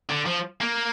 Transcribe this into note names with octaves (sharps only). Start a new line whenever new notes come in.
D3
F3
A#3